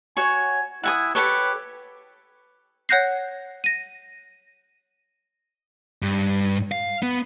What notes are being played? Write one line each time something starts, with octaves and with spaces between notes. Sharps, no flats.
F#4 C#5 G#5
E4 F#5 G#5 D#6
G4 A4 B4 C#5
C#5 F#5 F#6 G6 A#6 C7
A#6 D#7
G2
F5
B3